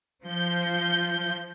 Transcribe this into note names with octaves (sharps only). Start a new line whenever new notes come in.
F3 G6